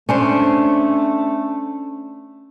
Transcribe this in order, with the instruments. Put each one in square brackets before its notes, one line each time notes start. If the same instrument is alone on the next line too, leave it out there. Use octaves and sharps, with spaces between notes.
[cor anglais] A3 [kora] C#4 D4 C5